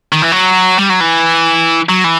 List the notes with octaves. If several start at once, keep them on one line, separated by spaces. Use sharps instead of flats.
D#3
E3
F#3
G3
F#3
E3
F#3
E3